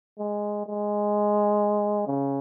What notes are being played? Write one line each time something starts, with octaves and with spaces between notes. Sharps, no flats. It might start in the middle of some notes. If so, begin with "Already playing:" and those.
G#3
G#3
C#3